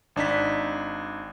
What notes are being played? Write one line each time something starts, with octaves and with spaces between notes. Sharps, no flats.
G#1 D4 D#4 B6